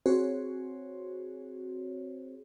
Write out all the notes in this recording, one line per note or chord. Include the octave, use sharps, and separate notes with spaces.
C4 F#4 G#4 C5 C#5